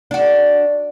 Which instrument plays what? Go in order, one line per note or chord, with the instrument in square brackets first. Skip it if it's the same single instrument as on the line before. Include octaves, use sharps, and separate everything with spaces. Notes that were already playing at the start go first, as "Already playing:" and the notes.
[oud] D4 F#4